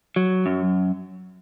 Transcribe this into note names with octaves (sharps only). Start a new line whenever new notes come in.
F#3
F#2